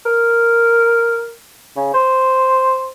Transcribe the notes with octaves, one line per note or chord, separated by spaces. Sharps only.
A#4
C#3
C5